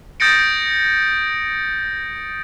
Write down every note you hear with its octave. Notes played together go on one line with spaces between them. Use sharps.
D#6 G6 A6 A#6 C#7 D7